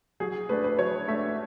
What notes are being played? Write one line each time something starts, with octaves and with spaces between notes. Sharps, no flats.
F#3 G#4
A3 D4 B4
B4
F#3 C#5
A3 D4 E5